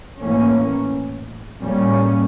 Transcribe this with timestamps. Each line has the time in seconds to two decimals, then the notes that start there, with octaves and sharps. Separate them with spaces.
0.20 A2 E3 A#3 C#4
1.62 A2 G3 A#3 C#4